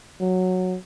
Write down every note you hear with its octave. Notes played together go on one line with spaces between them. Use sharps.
F#3